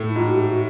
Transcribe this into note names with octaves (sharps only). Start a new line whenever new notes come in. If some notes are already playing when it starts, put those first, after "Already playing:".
Already playing: A2
E4
G#2 F4
F#4
G4
F#4